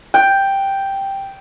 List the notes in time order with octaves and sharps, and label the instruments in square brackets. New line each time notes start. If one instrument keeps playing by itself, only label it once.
[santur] G5